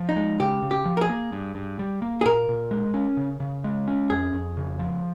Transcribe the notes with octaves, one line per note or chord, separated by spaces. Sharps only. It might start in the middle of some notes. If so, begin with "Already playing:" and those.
Already playing: F3
D#4
G#3
C#3 G4
C#3
G4
F3
A#4
G#4
A#3
G2
G2
G3
A#3
G#4
A#2 A#4
A#2
G#3
C#4
C#3
C#3
G#3
C#4
F2 G#4
F2
C#3
F3